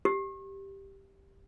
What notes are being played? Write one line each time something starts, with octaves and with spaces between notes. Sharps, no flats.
G4